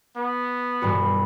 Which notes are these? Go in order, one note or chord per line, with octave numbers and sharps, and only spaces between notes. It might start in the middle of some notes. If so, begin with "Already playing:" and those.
B3
E1 G2 F#4 B5